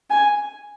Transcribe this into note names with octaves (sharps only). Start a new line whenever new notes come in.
G#5